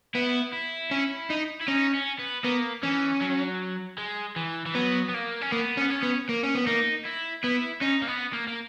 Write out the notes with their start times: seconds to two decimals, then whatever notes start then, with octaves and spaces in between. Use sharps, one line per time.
0.14 B3 E4
0.53 E4
0.91 C#4
1.30 D#4
1.61 E4
1.68 C#4 D#4
1.94 C#4
2.19 B3
2.44 A#3 B3
2.83 E3 C#4
3.22 F#3
3.98 G#3
4.36 E3
4.66 E3
4.75 F#3 B3
5.09 B3
5.14 A#3
5.42 C#4
5.52 A#3 B3
5.77 C#4
5.81 B3
5.90 C#4
6.03 B3
6.29 A#3
6.43 C#4
6.55 B3
6.66 A#3 D#4
7.05 E4
7.44 B3 E4
7.81 C#4 D#4
8.02 A#3
8.07 B3
8.33 A#3
8.47 A#3